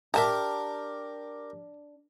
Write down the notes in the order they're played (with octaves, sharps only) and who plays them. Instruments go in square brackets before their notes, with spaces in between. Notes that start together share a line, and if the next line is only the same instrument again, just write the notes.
[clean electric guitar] D4 [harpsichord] G4 A#4 [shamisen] E5 A5 A#5